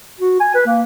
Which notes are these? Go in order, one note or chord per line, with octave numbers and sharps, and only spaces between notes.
F#4
G#5
B4
A#3